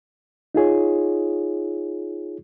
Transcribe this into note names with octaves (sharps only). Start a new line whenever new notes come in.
D#4 F4 G#4 C#5